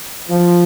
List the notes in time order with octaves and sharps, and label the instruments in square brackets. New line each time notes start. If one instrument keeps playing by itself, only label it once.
[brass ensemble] F3